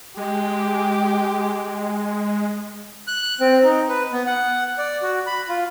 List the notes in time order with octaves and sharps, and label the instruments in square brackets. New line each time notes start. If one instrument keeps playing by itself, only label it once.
[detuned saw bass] G#3 [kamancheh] G4
[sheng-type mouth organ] F#6
C4
D#4
B4
B3
F#5
D5
F#4
B5
F4